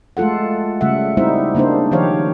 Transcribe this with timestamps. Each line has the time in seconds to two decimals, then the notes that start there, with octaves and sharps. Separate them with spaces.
0.17 G#3 A3 F4 A4 F#5
0.81 C#3 G3 A3 E5 F#5
1.17 G3 C4 D#4 E4 C5 E5
1.55 C#3 A#3 D4 D#4 C5
1.91 D#3 F3 G4 C5 C#5 F5